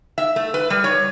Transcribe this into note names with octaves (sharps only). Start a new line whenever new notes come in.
E5
A3
B4
G3
C#5